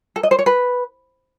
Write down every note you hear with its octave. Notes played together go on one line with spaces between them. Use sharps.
A4
D#5
C5
C#5
B4